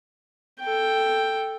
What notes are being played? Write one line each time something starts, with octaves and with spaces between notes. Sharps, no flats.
A4 G5